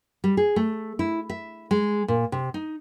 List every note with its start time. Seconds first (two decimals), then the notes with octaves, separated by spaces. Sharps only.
0.24 G3
0.37 G#4
0.56 A3
0.99 E4
1.30 E5
1.71 G#3
2.08 A#2
2.32 C3
2.54 D#4